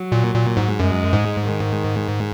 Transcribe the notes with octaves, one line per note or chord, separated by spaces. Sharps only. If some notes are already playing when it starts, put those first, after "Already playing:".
Already playing: F#3
A#2
A#2
G#2
F#2 G#3
G#2
D#3